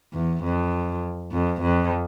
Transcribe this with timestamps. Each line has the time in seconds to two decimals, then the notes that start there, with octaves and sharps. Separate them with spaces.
0.13 E2
0.43 F2
1.32 F2
1.61 F2